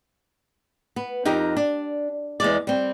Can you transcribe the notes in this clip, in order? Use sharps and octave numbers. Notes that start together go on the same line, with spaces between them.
B3
F2 D#4 G4 A#4
D4
E2 G#3 D5
G3 C4